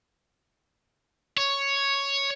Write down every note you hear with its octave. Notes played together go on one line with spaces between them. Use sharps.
C#5